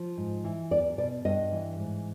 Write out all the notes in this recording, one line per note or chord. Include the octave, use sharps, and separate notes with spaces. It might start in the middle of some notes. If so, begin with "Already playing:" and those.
Already playing: F3
G#2
E3
E2 D5
B2 D5
G2 D#5
E3
G#2